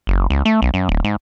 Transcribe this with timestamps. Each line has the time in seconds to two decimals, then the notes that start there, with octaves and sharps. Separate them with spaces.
0.07 F#1
0.30 C#2
0.45 A3
0.62 B1
0.74 F#2
0.89 D1
1.04 G#2